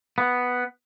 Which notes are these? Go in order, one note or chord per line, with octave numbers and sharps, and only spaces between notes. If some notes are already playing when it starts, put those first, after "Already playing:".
B3